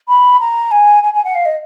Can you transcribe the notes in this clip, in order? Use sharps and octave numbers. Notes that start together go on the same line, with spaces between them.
B5
A#5
G#5
G#5
G#5
F#5
F5
D#5